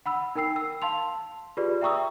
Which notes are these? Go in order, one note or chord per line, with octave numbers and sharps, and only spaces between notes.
F#5 B5 E6
D#4 A#4 G5 E6 C7
E6
F5 A5 C6 F7
F4 G4 G#4 B4 D5
E5 G5 A#5 C#6 D#6 E6